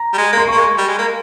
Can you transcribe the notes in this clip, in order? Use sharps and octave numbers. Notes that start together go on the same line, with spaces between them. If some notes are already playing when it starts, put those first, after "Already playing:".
Already playing: A#5
G3
G#3
A#3 C6
A#3 C#6
G#3
G3
G#3
A#3